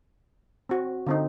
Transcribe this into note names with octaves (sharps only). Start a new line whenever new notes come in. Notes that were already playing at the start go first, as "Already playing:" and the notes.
C4 F#4
D3 C4 D#4